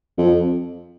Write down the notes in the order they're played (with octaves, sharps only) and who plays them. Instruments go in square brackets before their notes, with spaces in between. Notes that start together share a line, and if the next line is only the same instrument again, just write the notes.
[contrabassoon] F2